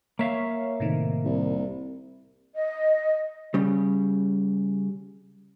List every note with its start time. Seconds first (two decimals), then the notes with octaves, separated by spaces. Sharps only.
0.19 A#3 C#5 E5 F5
0.80 A2 C3 D#3
1.25 C2
2.55 D#5
3.54 C#3 G3